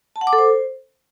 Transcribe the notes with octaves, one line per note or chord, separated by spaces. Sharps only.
A5
F#5
D6
A4
C5